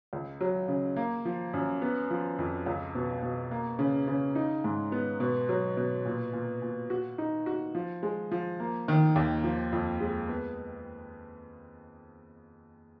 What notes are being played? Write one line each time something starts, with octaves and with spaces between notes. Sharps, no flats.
C#2
F#3
C#3
A#3
F3
F#2
B3
F3
F2
C#2
B2
B2
A#3
C#3
C#3
D#4
G#2
B3
B2
F#3
B2
A#2
A#2
A#2
F#4
D#4
F#4
F3
G#3
F3
A#3
D#3
D#2
F3
F2
G#3
B3